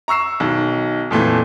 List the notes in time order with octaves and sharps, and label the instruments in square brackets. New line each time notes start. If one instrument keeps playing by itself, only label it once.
[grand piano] A#5 C#6 E6 C7 E7
B1 D#3
F2 A#2 E3 A3